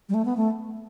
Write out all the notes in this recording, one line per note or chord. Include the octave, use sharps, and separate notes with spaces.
G3
A3
B3
A3